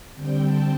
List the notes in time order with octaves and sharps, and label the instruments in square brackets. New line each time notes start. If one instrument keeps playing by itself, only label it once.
[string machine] D3 G3 C4 G5
A5